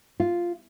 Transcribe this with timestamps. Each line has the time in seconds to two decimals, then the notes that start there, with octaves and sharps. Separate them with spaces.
0.20 F4